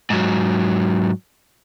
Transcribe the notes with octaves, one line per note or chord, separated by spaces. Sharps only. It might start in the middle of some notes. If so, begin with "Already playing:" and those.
G#2 F#3